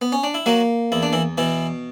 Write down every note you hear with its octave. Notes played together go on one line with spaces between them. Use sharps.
B3
C#4
D4
E4
F#3 A#3 F#4
E2 E4
D4
E3 E4
B2 E3 E4